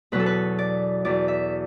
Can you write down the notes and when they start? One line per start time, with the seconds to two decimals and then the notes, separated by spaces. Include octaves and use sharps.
0.12 E2 B2 F#3 B4
0.20 A4
0.26 B4
0.59 D5
1.05 E2 B2 F#3 D5
1.28 E5